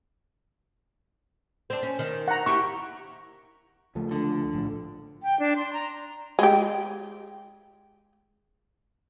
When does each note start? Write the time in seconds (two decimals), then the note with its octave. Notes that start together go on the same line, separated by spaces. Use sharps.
1.70 C4 D4
1.83 C#4
1.99 D#3
2.28 F#5 A#5
2.46 E4 G4 C#6
3.95 C#2 F3 A3
4.11 D3
4.53 A#1 A2 F3
5.23 G5
5.40 D4
5.56 C6
5.73 A#5
6.39 G#3 G4